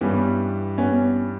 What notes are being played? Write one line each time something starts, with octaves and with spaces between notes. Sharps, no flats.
G2 E3 G3 B3 C#4
B3 C#4